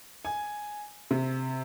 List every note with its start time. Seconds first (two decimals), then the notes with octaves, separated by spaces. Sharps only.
0.25 G#5
1.11 C3